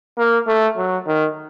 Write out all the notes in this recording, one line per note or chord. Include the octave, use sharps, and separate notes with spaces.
A#3
A3
F#3
D#3